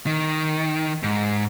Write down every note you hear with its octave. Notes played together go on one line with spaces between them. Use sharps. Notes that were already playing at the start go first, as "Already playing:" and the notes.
D#3
G#2